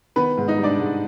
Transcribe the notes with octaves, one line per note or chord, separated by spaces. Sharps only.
D#3 B3 B4
G#2
D#4 D#5
G3
D4 D5
G#2